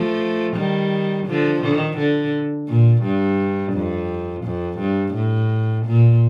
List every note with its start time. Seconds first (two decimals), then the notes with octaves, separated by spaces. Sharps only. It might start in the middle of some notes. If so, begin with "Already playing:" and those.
Already playing: F3 A3
0.56 D#3 G3
1.26 D3 F3
1.62 D#3
1.98 D3
2.68 A#2
3.03 G2
3.73 F2
4.45 F2
4.79 G2
5.14 A2
5.86 A#2